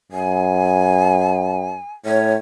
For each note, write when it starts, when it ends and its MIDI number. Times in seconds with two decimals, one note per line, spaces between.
0.12 1.79 42
0.12 1.93 80
2.06 2.36 45
2.06 2.33 73